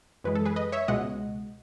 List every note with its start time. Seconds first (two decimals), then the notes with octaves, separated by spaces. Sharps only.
0.24 F#2 E3 G#3 B4
0.35 A4
0.45 G#4 B4
0.56 B4 D#5
0.72 C#5 E5
0.88 C#2 B2 G#3 D#5 F#5